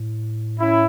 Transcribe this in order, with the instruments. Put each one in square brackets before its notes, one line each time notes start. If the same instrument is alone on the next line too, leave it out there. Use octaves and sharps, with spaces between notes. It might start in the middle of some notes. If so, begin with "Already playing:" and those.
Already playing: [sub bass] A2
[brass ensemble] C#4 E4